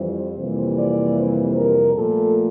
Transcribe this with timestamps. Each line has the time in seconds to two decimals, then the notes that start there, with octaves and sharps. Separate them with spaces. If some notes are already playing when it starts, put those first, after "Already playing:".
Already playing: F2 E3 G3 C5
0.38 F2 C3 E3 G3 A#3
0.77 D5
1.16 C5
1.55 A#4
1.94 A#2 F3 A3 A4